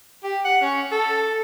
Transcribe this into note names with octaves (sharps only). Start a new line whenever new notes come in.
G4
F#5
C#4
A4